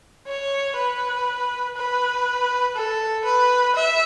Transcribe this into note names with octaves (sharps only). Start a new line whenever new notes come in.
C#5
B4
B4
A4
B4
E5